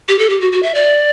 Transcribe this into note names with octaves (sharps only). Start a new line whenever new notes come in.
G4
A4
G4
F#4
F#4
E5
D5